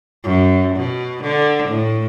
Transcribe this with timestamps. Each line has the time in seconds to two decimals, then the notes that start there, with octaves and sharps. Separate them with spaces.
0.24 F#2
0.76 B2
1.24 D3
1.69 A2